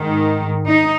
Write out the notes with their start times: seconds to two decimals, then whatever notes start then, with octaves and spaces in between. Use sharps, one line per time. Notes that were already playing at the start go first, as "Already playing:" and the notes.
Already playing: G#2 D#3
0.67 D#4